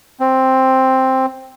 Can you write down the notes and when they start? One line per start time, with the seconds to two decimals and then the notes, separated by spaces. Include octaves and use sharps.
0.20 C4